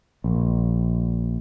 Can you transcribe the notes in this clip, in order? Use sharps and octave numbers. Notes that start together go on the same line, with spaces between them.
A#1